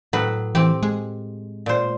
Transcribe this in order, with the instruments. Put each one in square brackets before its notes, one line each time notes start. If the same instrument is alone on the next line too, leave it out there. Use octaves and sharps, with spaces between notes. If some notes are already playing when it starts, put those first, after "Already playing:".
[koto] A2 F#3 B4
[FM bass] E3 [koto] C4 G4
[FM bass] G#3
[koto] A#2 C5